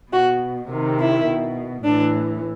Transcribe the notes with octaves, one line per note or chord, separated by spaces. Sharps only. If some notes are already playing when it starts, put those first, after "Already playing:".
B2 F#4
C3 D#3
E4
B2
A2 E3 D4